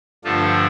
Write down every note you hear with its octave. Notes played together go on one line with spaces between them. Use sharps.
G2 D3 F3 A3 D4 F4